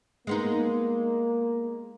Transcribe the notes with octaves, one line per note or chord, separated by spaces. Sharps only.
G#3 A#3 B3 D#4